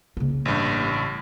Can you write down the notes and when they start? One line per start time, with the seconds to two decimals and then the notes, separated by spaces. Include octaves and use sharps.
0.17 C#3 A#3
0.45 A1 G2